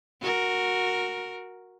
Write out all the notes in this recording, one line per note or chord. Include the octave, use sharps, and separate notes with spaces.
F#4 A#4